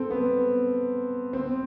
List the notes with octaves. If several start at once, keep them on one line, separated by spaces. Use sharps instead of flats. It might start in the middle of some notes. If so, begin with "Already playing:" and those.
Already playing: C4 A4
B3
C4